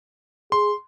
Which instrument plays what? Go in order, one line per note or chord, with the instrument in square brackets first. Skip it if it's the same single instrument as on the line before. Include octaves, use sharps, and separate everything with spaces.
[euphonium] G#4 [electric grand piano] C6